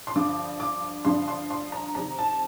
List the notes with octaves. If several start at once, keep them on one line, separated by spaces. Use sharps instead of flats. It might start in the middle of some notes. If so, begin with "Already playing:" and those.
C6
G2 D3 F3 D6
D6
G2 D3 F3 C6
C6
C6
A#5
F2 C3 D#3 A#5
A5